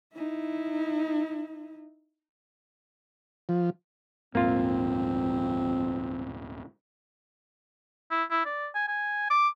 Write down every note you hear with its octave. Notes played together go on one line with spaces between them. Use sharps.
D#4 E4
F3
D#1 F2 G#2 A#3 C4 F4
E4
E4
D5
G#5
G#5
D6